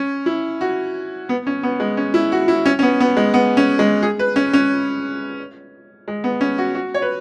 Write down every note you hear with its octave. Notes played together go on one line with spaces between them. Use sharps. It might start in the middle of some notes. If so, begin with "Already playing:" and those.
Already playing: C#4
E4
F#4
B3
C#4
B3
G#3
C#4
E4
F#4
E4
C#4
C#4
B3
B3
G#3
B3
C#4
G#3
G#4
B4
C#4
C#4
G#3
B3
C#4
F#4
F#4
C#5
B4